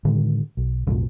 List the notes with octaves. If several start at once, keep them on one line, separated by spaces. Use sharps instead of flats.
A2 D3 D#3 G#3
B1
B1 F2 A2 F3